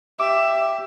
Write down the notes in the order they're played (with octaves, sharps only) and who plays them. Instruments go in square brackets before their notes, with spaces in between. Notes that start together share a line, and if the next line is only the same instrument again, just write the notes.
[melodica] G4 [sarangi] E5 [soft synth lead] D6